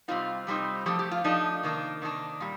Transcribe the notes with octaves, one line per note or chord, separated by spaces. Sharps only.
C3 G3 C4 D#4 F4
C3 G3 C4 D#4
F3 A3 D4 G4
G4
F4
F3 A3 D4 D#4
C3 D#3 A#3 D4
C3 D#3 A#3 D4
A#2 G3